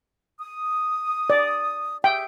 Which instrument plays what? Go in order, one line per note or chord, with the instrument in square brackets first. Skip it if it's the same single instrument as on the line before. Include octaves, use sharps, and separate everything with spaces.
[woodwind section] D#6
[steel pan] D5
[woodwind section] G4 G#4 E5 [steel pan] G5